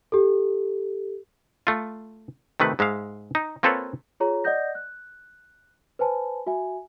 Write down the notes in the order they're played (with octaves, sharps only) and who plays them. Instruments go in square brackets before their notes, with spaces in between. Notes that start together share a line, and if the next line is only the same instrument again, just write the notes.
[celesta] G4 A4
[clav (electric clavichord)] A3 F4
C3 D#3 A3 B4
G#2 G#3 E5 F5
D#4
A#3 C4 F4 A4 B4 C#5
[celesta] F4 G#4 C#5 A#5
D5 D#5 F#5 D#6 G6 A#6
F#6
B4 C5 G#5 A5 B5
F#4 E5 G#5